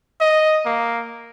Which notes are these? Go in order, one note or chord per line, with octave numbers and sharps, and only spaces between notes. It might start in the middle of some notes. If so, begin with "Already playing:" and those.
D#5
A#3